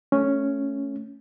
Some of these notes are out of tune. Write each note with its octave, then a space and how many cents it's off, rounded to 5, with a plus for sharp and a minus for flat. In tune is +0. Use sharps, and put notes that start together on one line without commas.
A3 +5 C#4 +0